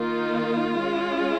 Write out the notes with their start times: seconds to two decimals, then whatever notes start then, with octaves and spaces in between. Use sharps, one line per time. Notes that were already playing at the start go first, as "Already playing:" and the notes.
Already playing: D#3 A#3 D#4 F4
0.77 G#3 C#4